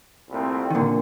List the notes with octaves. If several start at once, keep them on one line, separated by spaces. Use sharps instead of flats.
C2 A#2 A3 C4
D#3
A#2 D3